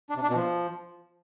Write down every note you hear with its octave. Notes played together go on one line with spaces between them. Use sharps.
D4
C3
D4
B2
F3